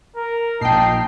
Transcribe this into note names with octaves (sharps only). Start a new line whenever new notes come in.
A#4
A#1 A#2 D#4 G5 A5 C7